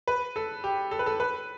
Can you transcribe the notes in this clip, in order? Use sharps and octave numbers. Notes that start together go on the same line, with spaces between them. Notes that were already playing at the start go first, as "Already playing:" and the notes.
B4
A4
G4
A4
B4
A4
B4